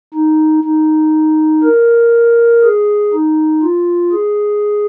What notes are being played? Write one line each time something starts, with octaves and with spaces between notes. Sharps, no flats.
D#4
D#4
A#4
G#4
D#4
F4
G#4